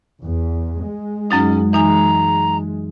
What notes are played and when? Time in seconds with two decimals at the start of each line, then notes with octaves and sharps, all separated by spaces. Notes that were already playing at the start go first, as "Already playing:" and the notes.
0.24 E2
0.84 G#3
1.31 F#2 F#3 C#4 D#4
1.73 E3 D#4 G#5 A#5